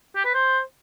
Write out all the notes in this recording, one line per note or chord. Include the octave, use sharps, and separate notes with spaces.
G4
B4
C5